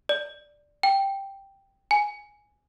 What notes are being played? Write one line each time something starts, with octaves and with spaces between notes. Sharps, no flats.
D5
G5
G#5